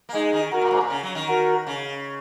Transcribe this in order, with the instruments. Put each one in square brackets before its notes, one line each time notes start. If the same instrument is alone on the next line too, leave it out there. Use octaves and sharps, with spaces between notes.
[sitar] A#3
[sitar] G#3 [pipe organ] D#4 G#4
[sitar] D#3
[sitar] D#3 [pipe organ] F#4 A#4
[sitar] A#2
G#2
A#2
C#3
F#3
D#3
[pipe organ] F#4 A#4
[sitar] C#3